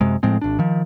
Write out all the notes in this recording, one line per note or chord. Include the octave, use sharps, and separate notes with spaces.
F#2 C3 G#3
A2 F3 G#3 C4
G#1 D4
D#3 F3